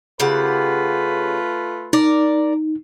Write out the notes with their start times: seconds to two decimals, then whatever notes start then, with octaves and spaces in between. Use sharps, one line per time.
0.20 C#3 A3 F4 G4 B4 F#5
1.93 D#4 A#4 D5